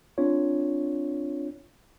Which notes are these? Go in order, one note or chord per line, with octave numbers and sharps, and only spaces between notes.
C4 D4 F4 C#5